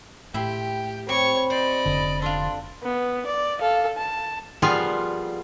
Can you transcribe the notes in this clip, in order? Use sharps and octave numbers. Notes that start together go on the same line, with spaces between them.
A2 E4 G4 E5 G5 C6
C4 G4 C#5 B5 C#6
C5 D5 D#5
F1 D3
D4 F4 A4 C6
B3
D5
A4 F5
A5
A#2 F3 G3 B3 F4 G#4